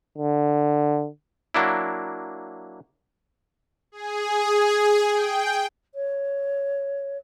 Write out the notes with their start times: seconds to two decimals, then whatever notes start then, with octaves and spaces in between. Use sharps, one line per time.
0.18 D3
1.54 F#3 A#3 D4 E4
3.92 G#4
5.08 G5
5.94 C#5